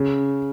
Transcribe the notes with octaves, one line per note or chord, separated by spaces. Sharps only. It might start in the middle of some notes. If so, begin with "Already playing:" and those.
Already playing: C#3